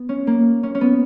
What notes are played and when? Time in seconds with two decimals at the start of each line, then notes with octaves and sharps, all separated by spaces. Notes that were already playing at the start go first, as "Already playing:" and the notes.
Already playing: B3
0.09 C#4
0.27 A#3
0.63 C#4
0.75 C#4
0.81 B3